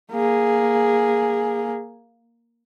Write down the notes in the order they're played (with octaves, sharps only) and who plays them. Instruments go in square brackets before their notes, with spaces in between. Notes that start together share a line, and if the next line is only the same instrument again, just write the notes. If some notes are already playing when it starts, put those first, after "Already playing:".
[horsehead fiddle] A#3 G#4